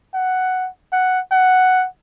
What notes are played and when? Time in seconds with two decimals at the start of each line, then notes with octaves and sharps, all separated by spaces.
0.14 F#5
0.93 F#5
1.31 F#5